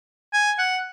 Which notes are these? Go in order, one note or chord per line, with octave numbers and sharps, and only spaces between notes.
G#5
F#5